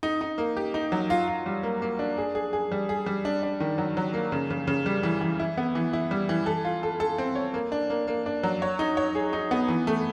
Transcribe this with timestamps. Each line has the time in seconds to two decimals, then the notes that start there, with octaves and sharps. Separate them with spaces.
0.03 D#4
0.21 D#4
0.38 A#3
0.57 G4
0.74 D#4
0.92 F#3
1.10 F4
1.28 F4
1.46 G3
1.63 A#3
1.82 A#3
1.99 D4
2.18 G#4
2.35 G#4
2.53 G#4
2.72 G3
2.89 G#4
3.06 G3
3.25 D4
3.43 D4
3.60 D#3
3.78 F#3
3.97 F#3
4.13 A#3
4.32 C#3
4.50 C#3
4.67 C#3
4.86 G3
5.03 E3
5.21 E3
5.39 E4
5.57 B3
5.75 E3
5.93 E4
6.11 G3
6.29 E3
6.46 A4
6.65 F4
6.83 A4
7.00 A4
7.18 C4
7.36 C#5
7.54 A#3
7.72 D4
7.90 A#3
8.07 A#3
8.26 D4
8.43 F#3
8.62 C#5
8.79 D#4
8.97 C#5
9.15 G#4
9.33 D#4
9.51 B3
9.68 E3
9.87 A3